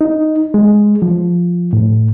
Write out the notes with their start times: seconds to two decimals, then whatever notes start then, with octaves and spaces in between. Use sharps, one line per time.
0.01 D#4
0.54 G#3
1.02 F3
1.73 A2